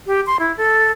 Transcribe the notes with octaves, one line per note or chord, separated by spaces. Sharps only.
G4
C6
E4
A4